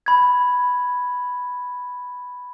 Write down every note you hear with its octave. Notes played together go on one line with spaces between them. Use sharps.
B5 G#6